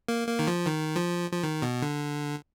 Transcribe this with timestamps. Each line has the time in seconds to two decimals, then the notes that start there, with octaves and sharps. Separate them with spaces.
0.09 A#3
0.28 A#3
0.39 D#3
0.47 F3
0.67 D#3
0.96 F3
1.33 F3
1.44 D#3
1.62 B2
1.82 D3